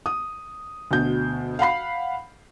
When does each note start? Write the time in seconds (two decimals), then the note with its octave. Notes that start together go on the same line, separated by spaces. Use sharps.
0.06 D#6
0.91 D2 B2 G6
1.59 F5 F#5 B5 C7